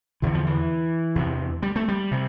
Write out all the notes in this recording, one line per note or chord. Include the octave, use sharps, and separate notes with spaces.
E2 D3 E3
F3
E3
E2 C3
G3
A3
G3
C3